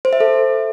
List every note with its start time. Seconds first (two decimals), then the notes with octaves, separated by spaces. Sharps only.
0.05 C5
0.13 E5
0.20 A4